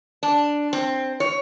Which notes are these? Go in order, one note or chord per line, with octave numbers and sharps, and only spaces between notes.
D4
C4
C#5